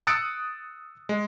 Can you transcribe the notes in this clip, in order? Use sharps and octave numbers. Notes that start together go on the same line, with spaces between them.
D#6 E6 F#6 A6 C#7 D7
G#3